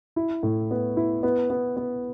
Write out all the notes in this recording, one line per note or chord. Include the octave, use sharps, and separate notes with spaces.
E4
A2
B3
E4
B3
B3
B3